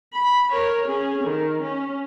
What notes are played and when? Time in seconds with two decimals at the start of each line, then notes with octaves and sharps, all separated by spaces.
0.14 B5
0.53 A#4 C#5
0.86 C#4 G#4
1.24 D#3
1.62 C#4